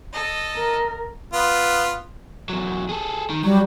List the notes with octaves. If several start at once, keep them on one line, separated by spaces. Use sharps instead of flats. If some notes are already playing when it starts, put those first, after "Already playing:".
A4 D#5
A#4
B3 F4
E2 F#3
G#4 A4
D#3
F#3 G3